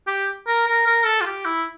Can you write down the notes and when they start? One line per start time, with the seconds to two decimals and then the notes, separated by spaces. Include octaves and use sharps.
0.07 G4
0.47 A#4
0.67 A#4
0.87 A#4
1.06 A4
1.21 F4
1.26 G4
1.45 E4